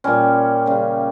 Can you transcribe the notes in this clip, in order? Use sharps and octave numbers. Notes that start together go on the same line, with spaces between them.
A#2 G3 C#4
C#3 G3